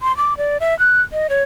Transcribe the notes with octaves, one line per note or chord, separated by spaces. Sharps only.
C6
D6
D5
E5
F#6
D#5
C#5